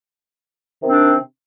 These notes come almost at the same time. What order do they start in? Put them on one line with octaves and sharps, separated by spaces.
C3 D#3 C4 D4